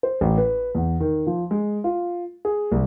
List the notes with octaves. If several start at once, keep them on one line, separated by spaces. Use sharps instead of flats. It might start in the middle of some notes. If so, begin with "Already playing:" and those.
C5
A1
B4
E2
D#3
F3
G#3
F4
G#4
C2